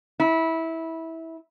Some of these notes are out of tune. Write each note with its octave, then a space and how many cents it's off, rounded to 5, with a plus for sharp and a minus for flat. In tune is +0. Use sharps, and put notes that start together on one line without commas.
E4 -20